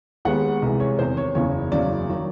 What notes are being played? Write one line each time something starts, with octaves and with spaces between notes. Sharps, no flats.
D#2 D#3 G#3 B3 F#5
C2 C3 E3 G#3
C#5
E2 C3 D#3 C5
C#5
F#1 E2 C#3 C#5
F#1 E2 C#3 F#3 D5
D#3 F#3